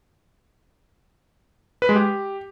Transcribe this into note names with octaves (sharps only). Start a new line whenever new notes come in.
B4
G#3
G4